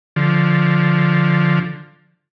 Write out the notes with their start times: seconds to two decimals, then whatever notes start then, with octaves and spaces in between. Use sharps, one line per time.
0.16 D3 F3